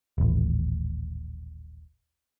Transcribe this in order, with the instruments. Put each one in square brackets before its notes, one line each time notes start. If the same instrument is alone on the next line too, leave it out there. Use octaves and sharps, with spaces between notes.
[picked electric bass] D#1 A1